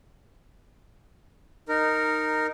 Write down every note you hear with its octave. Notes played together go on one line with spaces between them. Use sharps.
D#4 A#4